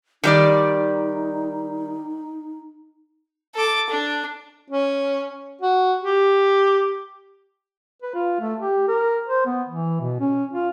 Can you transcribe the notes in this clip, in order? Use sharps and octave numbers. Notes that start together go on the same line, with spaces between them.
D#3 G3 D#4 D5
A4 D6
D4
C#4
F#4
G4
B4
F4
A3
G4
A#4
C5
B3
E3
B2
C#4
F4